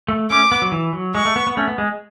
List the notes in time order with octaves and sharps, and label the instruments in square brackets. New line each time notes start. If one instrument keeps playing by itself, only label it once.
[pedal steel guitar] A3
[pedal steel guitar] A3 C#4 [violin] D6
[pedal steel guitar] B3
F#3
E3
F#3
[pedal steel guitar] G#3 [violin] C#6
[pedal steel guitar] A3
B3
B3
A3 C#4
B3
G#3